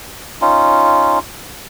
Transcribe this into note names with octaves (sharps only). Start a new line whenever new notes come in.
C#4 D#4 F4